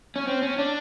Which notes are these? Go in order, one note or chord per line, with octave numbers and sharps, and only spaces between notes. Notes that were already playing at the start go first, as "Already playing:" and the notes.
C#4
C4
C#4
D4